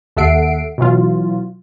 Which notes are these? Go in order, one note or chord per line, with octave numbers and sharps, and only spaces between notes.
D#2 A4 E5 F#5 C7 D7
B2 E3 F#3 F4